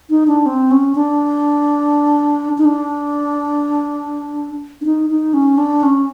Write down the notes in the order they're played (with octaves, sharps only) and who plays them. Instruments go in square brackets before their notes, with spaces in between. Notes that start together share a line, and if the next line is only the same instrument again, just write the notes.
[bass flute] D#4
D4
C4
C#4
D4
D#4
D4
D4
D#4
D#4
C#4
D4
C#4